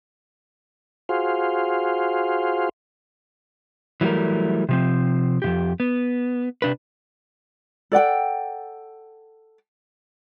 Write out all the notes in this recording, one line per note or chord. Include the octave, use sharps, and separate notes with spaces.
F4 F#4 G#4 C5 F5
E3 F#3 G3 A3 A#4
C3 F3 C4
F2 A#2 G4
B3
C3 D4 B4
A4 D5 F#5 G5